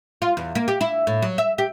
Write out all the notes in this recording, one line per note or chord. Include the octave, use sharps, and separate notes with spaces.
F4
E2
A#3
G4
E4
A2
F#3
E5
G4